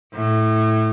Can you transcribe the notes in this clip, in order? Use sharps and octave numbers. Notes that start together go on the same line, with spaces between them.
A2